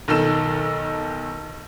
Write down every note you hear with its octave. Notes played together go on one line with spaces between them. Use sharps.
B1 D#3 A4 E7